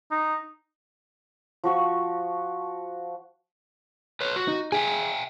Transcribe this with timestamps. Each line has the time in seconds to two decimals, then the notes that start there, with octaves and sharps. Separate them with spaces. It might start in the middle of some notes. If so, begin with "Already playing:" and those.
0.11 D#4
1.64 F3 F#4 C#6
4.21 B4 C#5
4.36 F#4
4.48 D#4
4.72 G#4 E5 G5 G#5